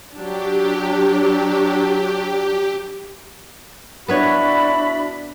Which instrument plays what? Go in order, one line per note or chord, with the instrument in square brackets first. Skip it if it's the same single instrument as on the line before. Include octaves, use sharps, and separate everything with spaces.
[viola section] F#3 D4 [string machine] G4
[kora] B3 B4 C#5 [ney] D4 [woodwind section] E4 F#4 B5